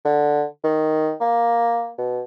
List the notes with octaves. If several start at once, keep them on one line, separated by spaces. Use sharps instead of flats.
D3
D#3
A#3
B2